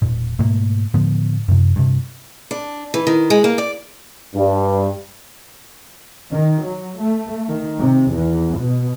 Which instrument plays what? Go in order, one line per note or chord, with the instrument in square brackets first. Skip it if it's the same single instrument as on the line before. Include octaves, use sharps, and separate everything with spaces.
[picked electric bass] E1 A#2
G#2 B2 A3 A#3
A2 D3 F3 B3
F#2 C3
G2 C3
[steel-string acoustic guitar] D4
E3
D#3
G#3
A#3
D5
[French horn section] G2
[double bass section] D#3
F#3
A3
D#3
C3
E2
B2